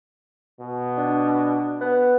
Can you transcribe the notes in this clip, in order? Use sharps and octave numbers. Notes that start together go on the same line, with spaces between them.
B2
D4
B3